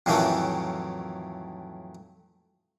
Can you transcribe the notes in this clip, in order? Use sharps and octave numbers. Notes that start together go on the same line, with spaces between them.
F2 A2 D#3 E3 F#3 A3